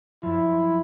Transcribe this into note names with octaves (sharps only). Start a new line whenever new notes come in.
F#2 F3 E4